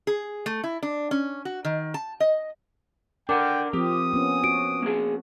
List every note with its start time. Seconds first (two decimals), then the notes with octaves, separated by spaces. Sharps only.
0.07 G#4
0.46 A3
0.64 E4
0.83 D4
1.11 C#4
1.45 F#4
1.65 D#3
1.94 A5
2.20 D#5
3.29 D4 A#4 F#5 G5 D6
3.73 F3 C4 G4 D#6
4.13 B3 C#4
4.44 F#4 D7
4.82 A#3 G#4